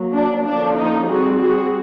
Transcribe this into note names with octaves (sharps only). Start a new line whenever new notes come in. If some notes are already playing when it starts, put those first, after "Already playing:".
Already playing: F#3 A#3
D4
D3 F3 A#3 C#4 D4
D#4
G3 C4 F#4 G#4
F#4 G#4